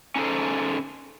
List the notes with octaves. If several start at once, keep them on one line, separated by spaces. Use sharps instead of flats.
C#4 D#4 G#4 A4 C5